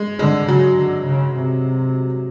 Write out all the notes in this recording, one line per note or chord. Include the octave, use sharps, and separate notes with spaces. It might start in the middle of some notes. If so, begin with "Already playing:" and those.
Already playing: G#3
D3 G#3
C#3 F#3
D3
C#3
C3